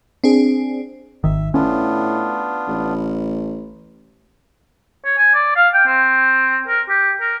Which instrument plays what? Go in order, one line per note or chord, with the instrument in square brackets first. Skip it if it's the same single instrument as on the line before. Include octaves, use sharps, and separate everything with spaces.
[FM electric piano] C4 D4 G#4
[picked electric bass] G#1 D#3 [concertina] E5
[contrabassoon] A2 [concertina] B3 D4 F4 [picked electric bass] C#4
[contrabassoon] A1
[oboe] C#5
G#5
D5
F5
G5
C4
A#4
G4
A#4